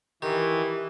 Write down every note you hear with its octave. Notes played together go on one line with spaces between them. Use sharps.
D#3 E3 G4